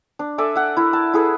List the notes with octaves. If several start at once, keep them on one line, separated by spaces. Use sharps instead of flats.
D4
A4 D5 E5 G#5
E5 F#5
E4 A#4
A5
E4 G#4 A4 B4